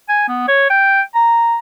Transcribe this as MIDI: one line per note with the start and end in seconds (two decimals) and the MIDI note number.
0.08 0.26 80
0.28 0.45 59
0.48 0.68 73
0.70 1.01 79
1.14 1.57 82